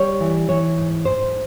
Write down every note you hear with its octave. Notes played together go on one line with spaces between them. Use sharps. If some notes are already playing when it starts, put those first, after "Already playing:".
Already playing: G3 C#5
E3
E3 C#5
G#2
G#2 C5